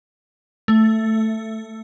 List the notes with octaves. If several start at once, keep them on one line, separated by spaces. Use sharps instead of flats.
A3